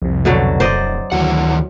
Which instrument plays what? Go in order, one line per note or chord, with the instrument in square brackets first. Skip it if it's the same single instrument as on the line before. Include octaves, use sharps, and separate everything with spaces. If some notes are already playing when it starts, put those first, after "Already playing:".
[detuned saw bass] C2 [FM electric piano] F2 C3
[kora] B2 D3 F#3
[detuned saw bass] D1 [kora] C5 D5 D#5
[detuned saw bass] D2 [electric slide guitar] D#3 E3 F#5 [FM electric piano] F#3